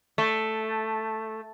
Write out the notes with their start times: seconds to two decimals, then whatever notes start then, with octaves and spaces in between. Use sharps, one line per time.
0.18 A3